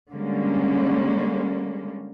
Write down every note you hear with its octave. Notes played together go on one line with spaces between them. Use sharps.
D3 G3 G#3 A#3 C#4